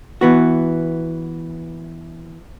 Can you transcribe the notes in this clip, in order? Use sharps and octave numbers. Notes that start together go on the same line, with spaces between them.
E3 B3 F#4